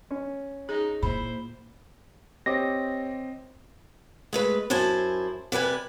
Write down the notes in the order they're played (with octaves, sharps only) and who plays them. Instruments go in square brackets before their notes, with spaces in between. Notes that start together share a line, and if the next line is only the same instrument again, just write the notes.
[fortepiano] C#4
[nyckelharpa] D#4 [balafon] G#4
[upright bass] A#2 [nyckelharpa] E4 C5 [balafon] B5
[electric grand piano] C4 D#5 D6 [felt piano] G4 C#5 [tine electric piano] A#6
[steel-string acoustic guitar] G#3 A3 B4
F#2 E4 C5 G#5 A5
C3 G3 B4 G#5